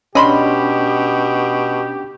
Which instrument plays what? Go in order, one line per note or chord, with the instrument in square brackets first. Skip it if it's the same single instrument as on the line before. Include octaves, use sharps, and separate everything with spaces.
[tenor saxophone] B2 [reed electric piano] C#4 D4 [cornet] G4 [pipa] D#5 B5 C6